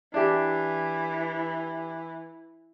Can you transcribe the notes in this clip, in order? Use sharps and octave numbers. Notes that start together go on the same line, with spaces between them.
E3 D4 E4 G4